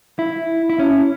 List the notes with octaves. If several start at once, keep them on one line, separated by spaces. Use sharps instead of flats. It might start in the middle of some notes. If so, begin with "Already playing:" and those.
E4
E4
C#4